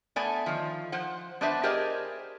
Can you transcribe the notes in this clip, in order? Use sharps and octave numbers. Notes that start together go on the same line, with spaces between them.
A3 B3 D5 G#5
D#3 F3
F3 C5 F#5
B3 D4 B4 C5 D5 E5
G4 G#4 A#4 C5 D5 D#5